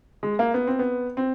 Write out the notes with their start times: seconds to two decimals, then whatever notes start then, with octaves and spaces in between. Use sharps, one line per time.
0.23 G#3
0.39 A#3
0.54 B3
0.67 C4
0.79 B3
1.17 C4